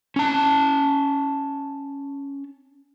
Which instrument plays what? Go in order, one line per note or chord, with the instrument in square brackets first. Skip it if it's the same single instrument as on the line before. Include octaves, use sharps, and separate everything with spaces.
[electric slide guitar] C#4 A5